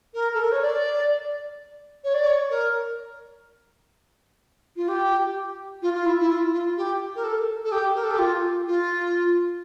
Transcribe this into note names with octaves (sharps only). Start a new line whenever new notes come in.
A#4
A4
A#4
C#5
D5
C#5
D5
C#5
A#4
F4
G4
F4
F4
E4
E4
F4
F4
G4
A#4
A4
A4
G4
A#4
A4
G4
F4
F4